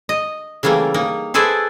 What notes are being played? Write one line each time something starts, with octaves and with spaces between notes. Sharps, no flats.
D#5
C#3 E3 G3 A3 A#3
A#3 D#4
G#4 A4 B4 C5 D5 E5